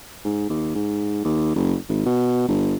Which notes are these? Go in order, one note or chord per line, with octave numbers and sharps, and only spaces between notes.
G#2
D#2
G#2
D#2
F#1
G#1
B2
G1